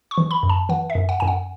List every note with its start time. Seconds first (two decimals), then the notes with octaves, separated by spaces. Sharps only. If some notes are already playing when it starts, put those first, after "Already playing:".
0.11 C#6
0.18 E3
0.31 B5
0.43 F#2
0.49 A5
0.69 E3 F#5
0.90 E5
0.95 F#2
1.09 F#5
1.20 F#2 G#5
1.28 F#5